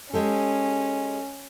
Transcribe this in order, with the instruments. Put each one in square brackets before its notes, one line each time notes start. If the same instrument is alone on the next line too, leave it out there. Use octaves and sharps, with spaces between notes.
[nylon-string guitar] G#3 G4 A4 [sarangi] C#4